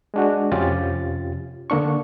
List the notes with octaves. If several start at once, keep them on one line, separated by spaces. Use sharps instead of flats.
G#3 D4 F#4
F2 C3 C#4 F4 G4 A6
D3 A#3 D4 C#6